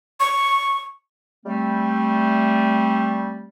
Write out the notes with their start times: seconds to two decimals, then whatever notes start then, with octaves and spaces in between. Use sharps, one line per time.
0.20 C#6
1.45 G3 A3 C4